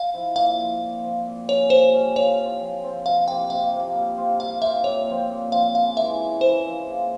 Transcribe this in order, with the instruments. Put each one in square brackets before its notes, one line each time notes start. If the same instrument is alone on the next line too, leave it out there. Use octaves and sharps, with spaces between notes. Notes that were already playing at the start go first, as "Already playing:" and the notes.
Already playing: [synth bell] F5
[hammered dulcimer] F3 C4 E4
[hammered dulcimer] A#2 [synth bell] F5
[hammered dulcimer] F3 C4
A#2
F3 C4
A#2
[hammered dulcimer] G3 C#4 [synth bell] C#5
[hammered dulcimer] A#2 [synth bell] C5
[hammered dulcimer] G3 C#4
[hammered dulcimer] F3 [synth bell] C#5
[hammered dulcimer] C4 F4
F3
C4 F4
[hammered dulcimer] C3 [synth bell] F5
[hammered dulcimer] F3 A#3 [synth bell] G5
[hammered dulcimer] C3 [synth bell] F5
[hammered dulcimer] F3 A#3
G3
C4 F4
[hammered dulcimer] G3 [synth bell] F5
[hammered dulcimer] C4 F4 [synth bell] E5
[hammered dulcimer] A#2 [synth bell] C#5
[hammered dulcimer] F3 C4
A#2
[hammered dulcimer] F3 C4 [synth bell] F5
[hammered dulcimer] C#3 [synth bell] F5
[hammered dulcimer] E3 G#3 E4 [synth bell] E5
[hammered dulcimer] C#3
[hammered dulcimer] E3 G#3 E4 [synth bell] C5
[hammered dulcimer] F3
A#3 F4 G#4